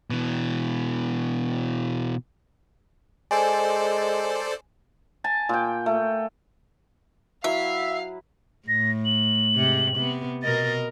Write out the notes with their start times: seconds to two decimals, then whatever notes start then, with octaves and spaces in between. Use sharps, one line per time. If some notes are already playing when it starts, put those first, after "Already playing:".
0.10 B2 E3
3.31 G#3 A4 C5 D5 G#5
5.24 G#5 A5
5.49 A#2 G5
5.86 A3
7.44 F#3 E4 B4 E5 F5
8.68 A2 A#6
9.05 F#7
9.55 G#2 C3
9.96 C3 B3
10.43 B2 A#4 D#5 A6